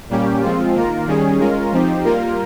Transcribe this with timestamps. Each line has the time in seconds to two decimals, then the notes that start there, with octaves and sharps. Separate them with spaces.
0.09 A#2 G3 A#3 C#4 G4
0.41 F3 G#3 C4 F4
0.74 D#3 A#3 F4 A#4
1.07 D#3 G3 C#4 G#4
1.39 G#3 C#4 F4 A#4
1.72 F3 C4 D#4 G4
2.04 G3 A#3 F4 A#4